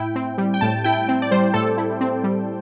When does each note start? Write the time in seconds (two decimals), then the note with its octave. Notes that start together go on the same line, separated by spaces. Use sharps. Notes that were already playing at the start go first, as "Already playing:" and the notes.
Already playing: A2 E4 G5
0.16 C4
0.38 G3
0.54 G5
0.61 A2 A5
0.84 E4 G5
1.08 C4
1.22 D5
1.31 G3 C5
1.54 A2 A4
1.77 E4
2.01 C4
2.24 G3